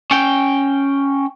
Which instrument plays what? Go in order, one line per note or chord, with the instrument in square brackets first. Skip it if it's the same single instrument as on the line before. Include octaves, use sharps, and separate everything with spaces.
[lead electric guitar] C#4 G5